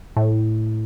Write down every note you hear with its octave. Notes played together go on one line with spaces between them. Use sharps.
A2